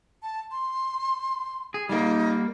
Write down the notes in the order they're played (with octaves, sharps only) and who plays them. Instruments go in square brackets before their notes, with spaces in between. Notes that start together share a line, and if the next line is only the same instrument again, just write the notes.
[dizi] A5
C6
[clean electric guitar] G#4
[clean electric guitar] G3 A#3 [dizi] D#4